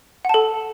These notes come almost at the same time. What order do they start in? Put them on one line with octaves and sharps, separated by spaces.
F#5 A5 A4